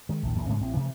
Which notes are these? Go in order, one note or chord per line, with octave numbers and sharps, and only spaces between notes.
D#3 G#3
A#1 D#2 A2
A#1 E2 A#2
G#2 C#3 G#3 A3
A1 C4
C3 E3 F3 A3